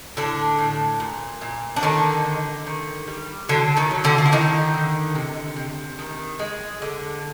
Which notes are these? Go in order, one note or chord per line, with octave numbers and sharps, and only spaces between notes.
A2 D3 D4
A2
A#2
A#2
D4
D3 D#3 D#4
D3
D#3
G3
D3 F#3 D4
D#3 D#4
F#3
D3 D4
F4
E4
D3 D#3 D#4
D3
C3
C3
D#3
G#3
D3